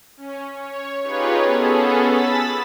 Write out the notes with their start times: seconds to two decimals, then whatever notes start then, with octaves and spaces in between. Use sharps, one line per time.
0.17 C#4
0.54 C#5
1.03 D#4 F4 G4 G#4 B4 C#5
1.43 B3 C#4 G#4 A4
2.02 B5 E6 A6 B6